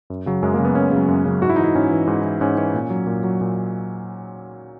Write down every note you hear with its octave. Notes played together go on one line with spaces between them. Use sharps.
F#2
C#3 F#3
F#2 G#3
A#3
C#3 F#3
B3
F#2 C#4
C#3 F#3
F#2
C#3 F#3
G#2 F#4
E4
E3 D#4
E4
G#2 C#4
E3
G#2
E3
G#2 C#4
E3 C#4
A#2
F#3
A#2
F#3
A#2